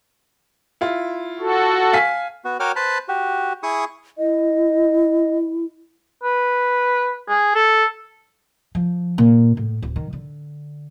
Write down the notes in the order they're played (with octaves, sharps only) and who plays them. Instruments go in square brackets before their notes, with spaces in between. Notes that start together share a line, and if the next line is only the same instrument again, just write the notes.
[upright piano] E4 F4
[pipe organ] F#4 A4
[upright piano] F5 G#5 B6
[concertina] B3 F#4
F#4 A#4 C#5 G5 D6 F6
B4 C5 A5 B5
F#4 G4
E4 G#4 C#6 D#6
[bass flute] E4 [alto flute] D#5
[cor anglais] B4
G#4
A4
[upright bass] F3
A#2
A2
D1
D#3
D3